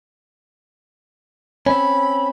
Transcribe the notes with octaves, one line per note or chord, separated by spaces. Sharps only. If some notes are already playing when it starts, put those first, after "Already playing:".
C4 C#4 B5